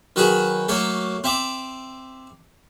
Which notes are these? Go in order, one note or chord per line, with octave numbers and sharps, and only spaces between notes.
D#3 F#3 F#4 G#4 B4
F#3 A3 A#3 C#5
C4 E5 D6